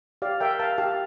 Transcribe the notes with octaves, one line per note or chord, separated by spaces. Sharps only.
G4 D5 F5
A#4 E5 G5
A#4 F5 A5
G4 F5 A5